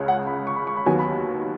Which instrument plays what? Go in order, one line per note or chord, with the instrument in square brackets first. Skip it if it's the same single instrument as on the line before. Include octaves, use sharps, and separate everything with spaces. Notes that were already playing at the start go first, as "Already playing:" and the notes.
Already playing: [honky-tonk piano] C#2 C#3 C#4
[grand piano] F#5
B5
C#6
B5
C#6
B5
[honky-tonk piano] D#2 D#3 F#3 B3 [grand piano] G#5
[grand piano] B5